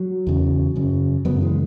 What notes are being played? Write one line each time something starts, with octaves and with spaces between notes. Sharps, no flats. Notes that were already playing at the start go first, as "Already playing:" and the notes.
Already playing: F#3
E2 C#3
F#2 C#3
F#2 C#3 F#3 B3
E3 G#3